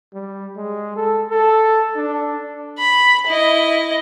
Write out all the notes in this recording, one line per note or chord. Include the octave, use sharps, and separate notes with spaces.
G3
G#3
A4
A4
D4
B5
E4 D#5